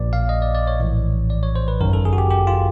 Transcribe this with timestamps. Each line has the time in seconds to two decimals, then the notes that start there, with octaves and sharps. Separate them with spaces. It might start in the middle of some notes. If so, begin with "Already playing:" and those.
Already playing: A#1 A#2 D5
0.13 F5
0.29 D#5
0.42 D5
0.55 D5
0.67 C#5
0.80 A#1 A2 E3
1.30 D5
1.43 C#5
1.56 C5
1.68 B4
1.81 G1 F#2 D#3 A#4
1.93 A4
2.05 G#4
2.13 F#4
2.18 G4
2.31 G4
2.47 F4